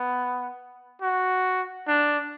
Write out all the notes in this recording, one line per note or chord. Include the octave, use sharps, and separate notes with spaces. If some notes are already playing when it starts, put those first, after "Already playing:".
Already playing: B3
F#4
D4